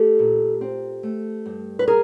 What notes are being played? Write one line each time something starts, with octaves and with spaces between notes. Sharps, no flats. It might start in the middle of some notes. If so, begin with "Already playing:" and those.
Already playing: A3 G4 A4
A#2
C4
A3
G2
B4
G#4 A#4